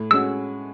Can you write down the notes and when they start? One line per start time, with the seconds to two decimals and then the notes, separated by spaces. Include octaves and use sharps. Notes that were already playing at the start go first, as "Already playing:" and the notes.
Already playing: A2
0.11 G#3 C#4 F#4 E6